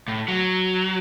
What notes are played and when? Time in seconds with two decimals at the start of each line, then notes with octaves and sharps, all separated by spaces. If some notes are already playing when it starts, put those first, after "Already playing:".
0.08 A2
0.28 F#3